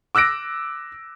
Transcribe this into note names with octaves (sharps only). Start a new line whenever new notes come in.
D6 E6 F#6 A#6 D7